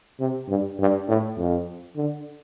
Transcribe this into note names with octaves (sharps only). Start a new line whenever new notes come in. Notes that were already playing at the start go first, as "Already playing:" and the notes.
C3
G2
G2
A2
F2
D3